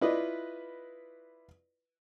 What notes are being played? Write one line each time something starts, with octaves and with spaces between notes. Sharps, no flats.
E4 F4 B4 D5 D#5